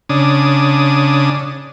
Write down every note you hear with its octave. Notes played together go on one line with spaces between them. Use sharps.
C#3 D4 D#6